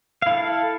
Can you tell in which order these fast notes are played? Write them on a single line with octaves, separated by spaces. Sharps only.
F5 E4 A4